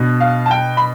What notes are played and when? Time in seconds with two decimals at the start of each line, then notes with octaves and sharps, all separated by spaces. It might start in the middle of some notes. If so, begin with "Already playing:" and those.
Already playing: B2 B3 D4
0.20 F5
0.46 A5
0.51 G5
0.77 B5